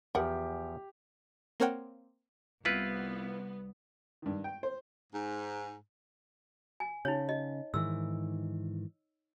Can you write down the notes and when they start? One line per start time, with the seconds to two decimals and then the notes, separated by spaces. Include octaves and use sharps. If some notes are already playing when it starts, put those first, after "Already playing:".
0.15 E2 F3 G4 A#4 F#5
1.60 A#3 C4 A#4 C#5 F#5 G5
2.65 C2 B3 E4 F4 B4
4.22 G2 D#3
4.44 G5
4.63 C5
5.13 G#2
6.80 G#5
7.05 C#3 D#4 C#5
7.29 D#5
7.74 G#2 D#3 E3 E6